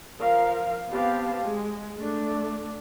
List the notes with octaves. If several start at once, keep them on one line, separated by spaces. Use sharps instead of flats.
F3 A#4 F5
B3 C4 G4 F5 A5
G#3
A3 D4